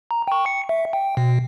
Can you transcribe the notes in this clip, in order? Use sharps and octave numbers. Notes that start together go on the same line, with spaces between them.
A#5
G5 C#6
C#7
E5
G5
B2